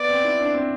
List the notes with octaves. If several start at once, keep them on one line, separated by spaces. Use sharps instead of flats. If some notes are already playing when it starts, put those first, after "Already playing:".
Already playing: B3 D5
C4
E4
D4
C4